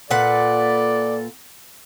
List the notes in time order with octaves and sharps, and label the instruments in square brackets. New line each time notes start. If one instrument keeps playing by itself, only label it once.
[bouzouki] A#2 B4 F#5 [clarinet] A4 [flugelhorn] D5